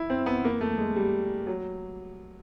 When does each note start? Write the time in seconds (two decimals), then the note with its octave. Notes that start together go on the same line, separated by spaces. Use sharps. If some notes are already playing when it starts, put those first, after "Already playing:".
Already playing: E4
0.10 C4
0.26 B3
0.44 A#3
0.61 A3
0.78 G#3
0.96 G3
1.47 F#3